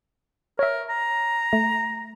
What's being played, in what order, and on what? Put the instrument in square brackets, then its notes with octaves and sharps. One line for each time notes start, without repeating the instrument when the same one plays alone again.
[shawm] A#4 [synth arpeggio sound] C#5 E5
[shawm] A#5
[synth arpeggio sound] A3